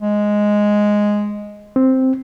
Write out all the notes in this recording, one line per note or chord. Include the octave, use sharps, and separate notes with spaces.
G#3
C4